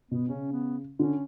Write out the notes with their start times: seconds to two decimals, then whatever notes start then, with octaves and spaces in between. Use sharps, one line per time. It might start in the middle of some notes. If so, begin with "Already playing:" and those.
0.11 B2 B3
0.29 C#3 C#4
0.53 B3
0.99 D3 C#4